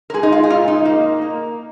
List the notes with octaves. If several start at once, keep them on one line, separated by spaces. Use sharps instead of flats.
A#4
G#3 G#4
D#4
F4
G#4
A#2 F4
D#4
A#3
A#3